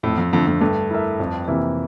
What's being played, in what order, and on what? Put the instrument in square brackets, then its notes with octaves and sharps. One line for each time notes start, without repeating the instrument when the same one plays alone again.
[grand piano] F2 [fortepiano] A2
[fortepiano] F2
[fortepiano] F2 [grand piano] D3 A3 D4
[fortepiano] F2
[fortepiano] G2 [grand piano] A3
[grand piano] E4 A#4 E5
F2
C3 E3 A#3 E4